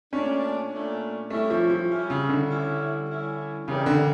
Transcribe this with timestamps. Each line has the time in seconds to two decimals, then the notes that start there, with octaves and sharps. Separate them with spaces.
0.13 A#2 A3 C#4 D4
0.72 A#2 A3 D4
1.30 G3 A3 C#4 E4
1.50 F3
1.70 F3
1.90 G3 C#4 E4
2.10 C#3
2.29 D3
2.49 G3 C#4 E4
3.09 G3 C#4 E4
3.68 C#3 E3 G3 C#4 G4 A#4
3.86 D3